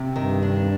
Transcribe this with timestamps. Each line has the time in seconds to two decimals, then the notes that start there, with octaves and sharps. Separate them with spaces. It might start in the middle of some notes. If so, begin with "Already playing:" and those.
Already playing: C3
0.15 G2 D#3
0.43 D4